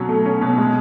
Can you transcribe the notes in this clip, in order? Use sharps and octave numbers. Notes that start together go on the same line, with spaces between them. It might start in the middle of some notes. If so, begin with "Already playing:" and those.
Already playing: B2 F#3 C#4
A3
C#4
B2
G#3